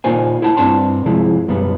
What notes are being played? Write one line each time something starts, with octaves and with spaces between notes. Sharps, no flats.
A#2 A#3 D#4 F4 C5 G#5
E4 C5 E5 F#5 A5
G2 C4 D4 A5 C6
C3 F3 G#3 E4
F#2 B2 G3 B3